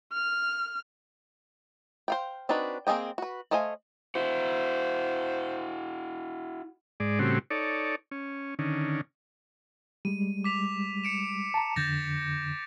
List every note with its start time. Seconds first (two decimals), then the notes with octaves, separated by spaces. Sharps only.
0.12 F6
2.08 C5 F5 G5
2.49 C4 D4 D#4 F#4 B4
2.87 A#3 C4 G#4 D#5 G5
3.18 F#4 B4
3.51 A3 C5 D#5 F5 G#5
4.15 E4 F#4 C5
7.00 G#2 G#3 D5
7.19 A2 C#3 G3 C4 F#4
7.51 D#4 A4 C#5 D5
8.11 C#4
8.59 D3 D#3 C#4
10.05 G3 G#3 D#7
10.44 D6 B6 F7
11.04 C#7 D7 E7
11.54 A5 A#5
11.76 F2 D3 G6 A6 A#6